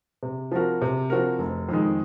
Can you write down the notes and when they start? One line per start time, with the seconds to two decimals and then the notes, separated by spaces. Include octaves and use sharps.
0.23 C3
0.52 F3 C4 F#4 A#4
0.82 C3
1.10 F3 C4 F#4 A#4
1.39 F1
1.69 F2 D#3 G#3